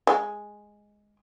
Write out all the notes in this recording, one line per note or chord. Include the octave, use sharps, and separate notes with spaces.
G#3